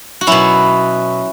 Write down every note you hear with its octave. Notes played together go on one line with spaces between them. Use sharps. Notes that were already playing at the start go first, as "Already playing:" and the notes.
F#4
B2 F#3 C#4 E4